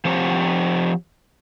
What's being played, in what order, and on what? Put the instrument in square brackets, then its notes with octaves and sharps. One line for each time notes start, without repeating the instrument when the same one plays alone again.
[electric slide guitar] F3 C4 G4 C#5